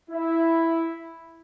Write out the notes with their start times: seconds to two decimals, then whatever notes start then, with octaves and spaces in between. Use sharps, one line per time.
0.10 E4